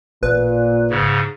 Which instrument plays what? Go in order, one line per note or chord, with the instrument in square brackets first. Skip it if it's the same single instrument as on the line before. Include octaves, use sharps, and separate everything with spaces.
[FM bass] A1 [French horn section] A#2 [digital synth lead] B4
[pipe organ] G#2 C#3